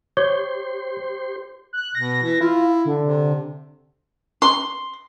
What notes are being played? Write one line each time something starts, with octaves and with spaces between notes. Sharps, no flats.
G4 C5 C#5 C6
F#6
B2 A#6
E3
E4 F4
D3
C3
C6